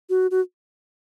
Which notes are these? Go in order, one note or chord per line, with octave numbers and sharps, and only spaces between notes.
F#4
F#4